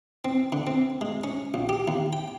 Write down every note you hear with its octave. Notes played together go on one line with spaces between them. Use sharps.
C4
D3
C4
G#3
C#4
A#1
G4
D#2
G5